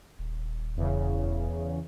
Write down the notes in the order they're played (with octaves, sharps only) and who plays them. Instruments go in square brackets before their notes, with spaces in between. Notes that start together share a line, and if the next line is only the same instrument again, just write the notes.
[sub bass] D#1
[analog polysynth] E2 C#3